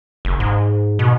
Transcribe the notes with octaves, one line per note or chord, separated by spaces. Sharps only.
F#1
G#2
B2